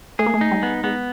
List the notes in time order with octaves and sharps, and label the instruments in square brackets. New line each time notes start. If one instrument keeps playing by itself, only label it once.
[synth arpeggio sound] A3 [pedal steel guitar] G#4
[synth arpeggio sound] A#3
A3
[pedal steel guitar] D#4
[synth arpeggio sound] G3
[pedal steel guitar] B3
[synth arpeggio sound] G#3 [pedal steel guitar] B3